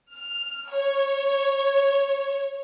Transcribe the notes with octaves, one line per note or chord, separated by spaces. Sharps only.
F6
C#5